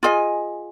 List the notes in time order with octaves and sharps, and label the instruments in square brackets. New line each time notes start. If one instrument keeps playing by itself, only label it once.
[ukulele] F4 G#4 D#5 G#5